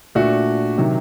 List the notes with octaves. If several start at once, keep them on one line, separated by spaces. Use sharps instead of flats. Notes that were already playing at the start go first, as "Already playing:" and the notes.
A#2 A3 D4 F#4
C3 D#3 F#3